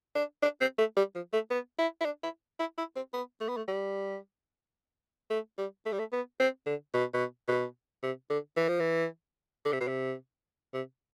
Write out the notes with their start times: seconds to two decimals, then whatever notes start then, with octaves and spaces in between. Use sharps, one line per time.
0.15 D4
0.42 D4
0.61 C4
0.78 A3
0.97 G3
1.15 F3
1.33 A3
1.51 B3
1.79 E4
2.01 E4
2.05 D4
2.23 E4
2.60 E4
2.78 E4
2.96 C4
3.14 B3
3.41 A3
3.49 B3
3.57 A3
3.68 G3
5.30 A3
5.58 G3
5.86 A3
5.92 G3
5.99 A3
6.12 B3
6.40 C4
6.66 D3
6.94 B2
7.14 B2
7.48 B2
8.03 C3
8.30 D3
8.57 E3
8.68 F3
8.80 E3
9.65 D3
9.73 C3
9.80 B2
9.87 C3
10.73 C3